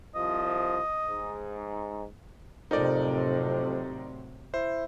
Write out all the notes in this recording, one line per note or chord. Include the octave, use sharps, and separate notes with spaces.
C2 F3 D#5
G#2
F2 A2 C3 F#3 D#4 A#4 D5
E4 C5